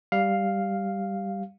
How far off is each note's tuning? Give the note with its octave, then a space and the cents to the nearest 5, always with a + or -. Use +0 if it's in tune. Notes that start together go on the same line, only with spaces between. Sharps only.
G3 +0 G4 +0 F5 +0